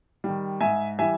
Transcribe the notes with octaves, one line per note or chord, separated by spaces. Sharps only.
D#3 G3
G#2 E5 G#5
E3 G3 E5 G#5